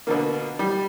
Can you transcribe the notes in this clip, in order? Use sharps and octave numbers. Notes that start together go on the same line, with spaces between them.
B2 D3 A#3
G3